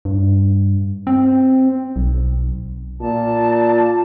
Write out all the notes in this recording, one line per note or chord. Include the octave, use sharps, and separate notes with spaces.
G2
C4
B1
A#2 A5